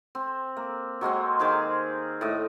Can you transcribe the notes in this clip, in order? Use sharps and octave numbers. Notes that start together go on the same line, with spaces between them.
C4
A#3
F#3 G#3 A#3 C4
D#3 G#4 C5 F5
A2 D#5